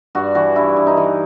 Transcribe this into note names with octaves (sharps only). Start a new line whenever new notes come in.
G2 F#4
E3 F#4
G2 E4
G2
D#4
E3